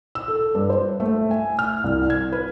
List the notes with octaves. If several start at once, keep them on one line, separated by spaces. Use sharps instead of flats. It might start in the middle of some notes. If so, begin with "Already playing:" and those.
E6
A4
G2
C5
A3
G#5
F6
C2
G#6
B4